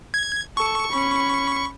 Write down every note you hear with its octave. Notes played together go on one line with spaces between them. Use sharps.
G#6
A4 C#6
C#4 B5